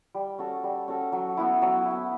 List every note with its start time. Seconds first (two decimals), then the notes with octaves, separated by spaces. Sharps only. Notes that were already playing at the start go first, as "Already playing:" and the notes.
0.14 G3
0.38 C#4 F#4 A4
0.64 G3
0.88 C#4 F#4 A4
1.12 F#3
1.37 B3 E4
1.62 F#3
1.85 B3 E4